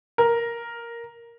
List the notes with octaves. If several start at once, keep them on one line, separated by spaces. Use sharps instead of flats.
A#4